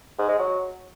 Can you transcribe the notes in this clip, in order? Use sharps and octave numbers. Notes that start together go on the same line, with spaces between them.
G#2
G#3
F#3